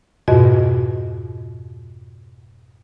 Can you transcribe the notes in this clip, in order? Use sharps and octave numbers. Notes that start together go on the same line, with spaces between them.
F2 G#2 B2 F#4 D#5